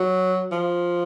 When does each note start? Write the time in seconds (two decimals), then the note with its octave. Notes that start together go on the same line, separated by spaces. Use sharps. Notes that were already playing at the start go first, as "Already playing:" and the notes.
Already playing: F#3
0.52 F3